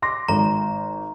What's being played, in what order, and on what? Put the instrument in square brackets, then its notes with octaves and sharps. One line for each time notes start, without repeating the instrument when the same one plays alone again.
[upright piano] C6 D6 A#6
[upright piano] G#1 [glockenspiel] A#5